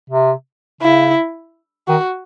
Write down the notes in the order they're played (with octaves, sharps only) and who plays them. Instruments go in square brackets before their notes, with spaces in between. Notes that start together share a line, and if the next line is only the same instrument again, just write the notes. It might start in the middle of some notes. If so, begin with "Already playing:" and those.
[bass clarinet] C3
[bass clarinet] C#3 [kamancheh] E4
[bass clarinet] D#3 [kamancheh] F#4